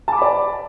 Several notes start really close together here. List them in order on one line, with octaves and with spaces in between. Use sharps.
A5 D6 B5 D5